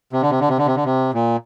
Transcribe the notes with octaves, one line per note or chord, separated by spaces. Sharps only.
C3
D3
C3
D3
C3
D3
C3
D3
C3
A#2